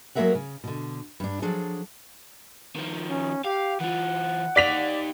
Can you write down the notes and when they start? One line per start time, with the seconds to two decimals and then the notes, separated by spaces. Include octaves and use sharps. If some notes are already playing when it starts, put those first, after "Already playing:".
0.15 F#3 G#3 A#3 A#4 E5 F#5
0.35 C#3
0.64 B2 D3
1.20 G2 D4
1.42 F3 F#3 D4 G#4 A4
2.75 D#3 F3
3.10 C#4
3.45 G4 F5
3.80 E3 F4 F#5
4.56 D#4 G4 D5 B6 F7